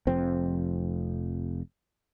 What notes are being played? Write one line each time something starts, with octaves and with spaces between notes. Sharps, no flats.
F1 F2 C4